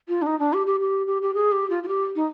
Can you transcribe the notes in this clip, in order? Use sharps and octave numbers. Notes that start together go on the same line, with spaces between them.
F4
D4
D#4
D4
G4
G4
G4
G4
G4
G#4
G4
F4
F4
G4
D#4